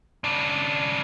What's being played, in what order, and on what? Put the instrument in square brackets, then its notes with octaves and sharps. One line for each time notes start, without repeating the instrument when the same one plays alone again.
[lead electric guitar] C#3 D4